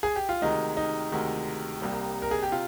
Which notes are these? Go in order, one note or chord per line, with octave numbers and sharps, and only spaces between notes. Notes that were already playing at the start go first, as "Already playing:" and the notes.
G#4
G4
F4
D2 C3 D#3 G#3 D#4
D#4
D2 C3 D#3 G#3
C2 C3 G3 A#3
A#4
G#4
G4
C3 F4